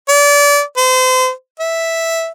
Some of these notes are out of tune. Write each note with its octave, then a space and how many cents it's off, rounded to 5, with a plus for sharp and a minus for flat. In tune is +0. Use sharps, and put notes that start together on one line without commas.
D5 -30
C5 -35
E5 -5